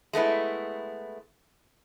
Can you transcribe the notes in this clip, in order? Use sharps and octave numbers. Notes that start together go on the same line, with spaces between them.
G#3 A3 B3 E4